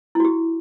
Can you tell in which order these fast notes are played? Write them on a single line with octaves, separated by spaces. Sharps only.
E4 F#4 G4